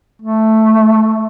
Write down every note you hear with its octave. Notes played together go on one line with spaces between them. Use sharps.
A3